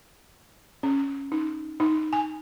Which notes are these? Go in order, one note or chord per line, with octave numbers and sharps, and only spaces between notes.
C#4
D#4
D#4
G#5